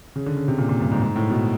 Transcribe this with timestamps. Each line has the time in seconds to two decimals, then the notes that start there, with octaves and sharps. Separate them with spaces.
0.16 C#3
0.26 D3
0.37 C#3
0.48 C3
0.58 A#2
0.69 A#2
0.80 G2
0.91 G#2
1.02 G#2
1.16 A2
1.30 B2